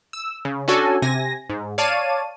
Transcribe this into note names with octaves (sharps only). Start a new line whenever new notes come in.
E6
C#3
C#4 D4 F#4 A4 G#5
C3 G#5 A#6
G#2
C#5 D5 F5 A5 D#7